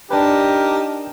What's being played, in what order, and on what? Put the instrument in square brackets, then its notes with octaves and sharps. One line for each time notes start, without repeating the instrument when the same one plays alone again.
[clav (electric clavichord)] D4 B4 [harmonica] D#4 A#4 A5 [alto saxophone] G4